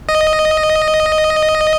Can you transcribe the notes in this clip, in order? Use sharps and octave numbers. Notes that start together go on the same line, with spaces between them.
D#5